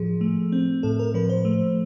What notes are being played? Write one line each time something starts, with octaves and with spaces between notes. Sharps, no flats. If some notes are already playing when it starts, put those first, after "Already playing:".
Already playing: A2 F3 G#4
A3
C4
A2 A4
A#4
F3 B4
C5
A3